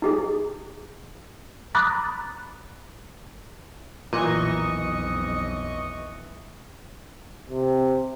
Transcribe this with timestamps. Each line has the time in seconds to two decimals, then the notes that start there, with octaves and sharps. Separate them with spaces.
0.02 D#4 G4 G#4
1.75 A#5 B5 D6 D#6 F#6 A6
4.13 B1 F2 A#2 E3 D#5 C#6
7.50 C3